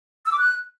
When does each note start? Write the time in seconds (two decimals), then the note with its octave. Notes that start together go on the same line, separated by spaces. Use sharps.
0.25 E6
0.32 D6
0.39 F#6